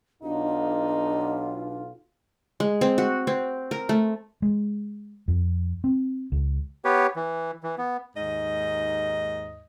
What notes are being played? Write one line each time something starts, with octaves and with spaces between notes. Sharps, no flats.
B1 D4 D#4 F4
G#3
C4
F#4
C4
A#4
A3
G#3
F2
C4
C#2
B3 G4 B4 C#5
E3
E3
B3
D#2 G#2 D#5